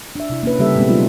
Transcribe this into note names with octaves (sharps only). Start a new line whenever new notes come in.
D4 E5
C3 E4
A#3 C#4 B4
C#3 G3 A#3 G4 A4 E5
B2 G#3 B3 C4
F#3 D#4 F4